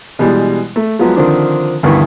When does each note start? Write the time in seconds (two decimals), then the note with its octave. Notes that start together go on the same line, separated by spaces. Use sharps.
0.19 B2 E3 G3 G#3
0.76 A3
0.99 F3 F#3 G#3 B3
1.17 D3 D#3 F3 C4 D4
1.83 D2 G2 D#3 E3 B3 C#6